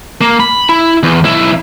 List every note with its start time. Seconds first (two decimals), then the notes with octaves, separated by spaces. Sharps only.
0.21 A#3
0.40 B5
0.69 E4
1.03 E2
1.25 B1 E4